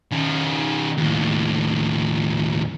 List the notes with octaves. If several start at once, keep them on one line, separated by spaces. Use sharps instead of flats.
D#3 C#4
D#2 A2